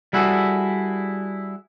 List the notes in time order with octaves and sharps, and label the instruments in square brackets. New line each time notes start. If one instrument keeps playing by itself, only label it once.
[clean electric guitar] G3 E4 F#4 G#4 A4